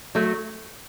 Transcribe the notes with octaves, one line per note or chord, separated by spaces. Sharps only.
F#3 A3